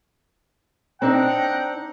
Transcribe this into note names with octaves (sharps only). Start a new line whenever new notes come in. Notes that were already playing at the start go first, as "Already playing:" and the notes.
C4 D4 D#4 F#5 G5 A#5